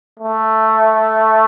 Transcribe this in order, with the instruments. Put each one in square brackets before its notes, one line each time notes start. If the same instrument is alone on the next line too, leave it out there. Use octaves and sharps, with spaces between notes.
[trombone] A3